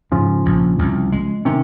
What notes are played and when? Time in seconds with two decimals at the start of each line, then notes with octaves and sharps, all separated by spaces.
0.12 G#2 C#3 F3
0.46 A#1
0.79 C2
1.12 G#3
1.45 C3 D#3 C#4